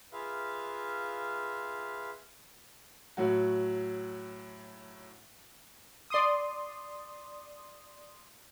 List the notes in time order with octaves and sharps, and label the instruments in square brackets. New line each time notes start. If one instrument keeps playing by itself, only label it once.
[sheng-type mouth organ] F4 G#4 B4 E5 F5
[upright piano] A2 F#3 F#4
[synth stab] D5 C6 D#6